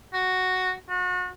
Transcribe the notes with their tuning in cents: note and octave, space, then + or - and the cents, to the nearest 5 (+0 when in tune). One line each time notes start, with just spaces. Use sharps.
F#4 +0
F#4 -35